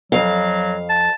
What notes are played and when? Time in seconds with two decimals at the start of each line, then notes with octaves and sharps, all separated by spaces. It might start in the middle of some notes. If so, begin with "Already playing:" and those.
0.12 F2 F#3 F5
0.89 A5